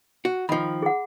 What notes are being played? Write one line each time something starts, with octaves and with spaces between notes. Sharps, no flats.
F#4
D#3 F3 B5
G#4 F#5